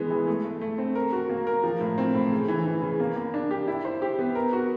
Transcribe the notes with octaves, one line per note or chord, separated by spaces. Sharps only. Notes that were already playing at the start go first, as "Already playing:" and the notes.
Already playing: E3 G#3 B3
E3
A3
A3
A3
C4
A#4
F#4
A#3
A#4
F3
A2
C4
A2
C#3
E3
E3
C#3
A#3
A#3
D4
G4
E4
C5
G4
B3
A#4
F#4